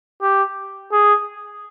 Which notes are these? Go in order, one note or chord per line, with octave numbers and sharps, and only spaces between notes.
G4
G#4